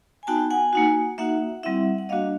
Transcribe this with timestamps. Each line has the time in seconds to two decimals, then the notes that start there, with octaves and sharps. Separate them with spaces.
0.23 G#5
0.27 B3 D#4 F#4 G5 A5
0.50 F#5 G#5
0.73 A#3 D#4 F#4
1.18 A#3 D#4 F#4 E5 F#5
1.63 G3 C4 E4 E5 F#5
1.98 F#5
2.09 G3 A#3 D4 F#4 D#5 F5